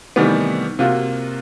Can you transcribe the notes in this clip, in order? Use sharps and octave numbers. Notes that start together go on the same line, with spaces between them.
C3 D#3 E3 G3 A3 B3
C3 A#3 F4 F#4